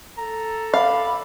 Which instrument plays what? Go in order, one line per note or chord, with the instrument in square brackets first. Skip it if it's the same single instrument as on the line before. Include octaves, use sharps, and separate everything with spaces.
[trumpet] A4 [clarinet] A#5
[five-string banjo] F5 [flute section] B5 D6